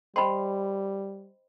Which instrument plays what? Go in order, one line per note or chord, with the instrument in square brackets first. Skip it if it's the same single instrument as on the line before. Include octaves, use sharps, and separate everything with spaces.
[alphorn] G3 [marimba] C5 D#5 G5 [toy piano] B5 C6